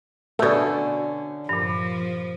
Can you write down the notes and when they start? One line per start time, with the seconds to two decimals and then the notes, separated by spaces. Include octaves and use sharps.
0.39 B2 D3 A3 C#4
1.49 G2 A#2 F3